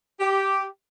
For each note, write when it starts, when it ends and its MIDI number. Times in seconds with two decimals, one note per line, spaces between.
0.20 0.64 67